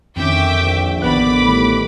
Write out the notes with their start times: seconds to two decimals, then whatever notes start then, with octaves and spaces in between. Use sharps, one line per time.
0.16 F2 D3 D#3 C#4 E5 G5 D6
0.60 A#1
1.02 A1 D3 D#3 B3 D5 B5 D6 F#6
1.42 A2 D#3 G3